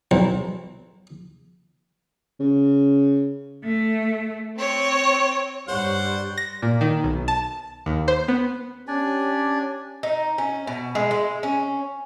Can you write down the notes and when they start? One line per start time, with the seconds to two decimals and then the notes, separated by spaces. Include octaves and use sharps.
0.11 B1
2.40 C#3
3.64 A3
4.58 C4 C#5
5.68 G2 G3 C5 C#5 F#5 C#6
6.38 A#6
6.62 A#2
6.81 D#3
7.04 B1
7.28 A5
7.86 D#2
8.08 C5
8.28 B3
8.88 C#4 D4 G4 D5 G#5
10.03 D#4
10.38 C#4
10.67 B2
10.95 G#3
11.11 G#3
11.43 C#4